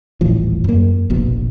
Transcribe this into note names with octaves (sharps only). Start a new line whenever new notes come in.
D#1 A1 A2 F3
F#2 A#3
F1 A#1 B2